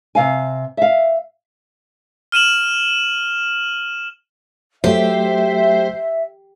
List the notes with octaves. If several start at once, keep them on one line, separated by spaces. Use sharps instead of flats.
C3 F5 G#5
E5 F5
F6 D#7 E7 F#7
F#3 A3 G4 C5 E5